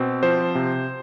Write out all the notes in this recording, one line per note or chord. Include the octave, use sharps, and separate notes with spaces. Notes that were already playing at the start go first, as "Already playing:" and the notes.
Already playing: B2 C4
F3 C5
C3